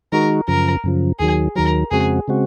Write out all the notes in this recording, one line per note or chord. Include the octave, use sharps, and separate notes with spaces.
D#3 G#3 D#4 F#4 A#4
F#2 C#3 F3 A#4
F#2 C#3 F3
D#2 D#3 F#3 G#4
D#2 D#3 F#3 A#4
F2 C#3 G#3 C4 F#4 G#4
C#3 G#3 C4 F#4